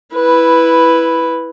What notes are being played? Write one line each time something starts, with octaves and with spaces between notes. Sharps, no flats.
E4 B4